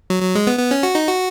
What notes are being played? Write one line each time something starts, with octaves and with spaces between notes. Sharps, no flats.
F#3
F#3
G#3
B3
B3
C#4
F#4
D#4
F#4